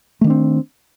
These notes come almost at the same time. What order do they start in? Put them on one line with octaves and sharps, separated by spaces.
A3 D#3 D4 C4